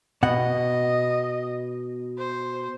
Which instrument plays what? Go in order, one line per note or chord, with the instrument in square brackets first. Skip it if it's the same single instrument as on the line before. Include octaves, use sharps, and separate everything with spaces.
[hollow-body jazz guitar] B2 F#5 [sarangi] D#5
[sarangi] C5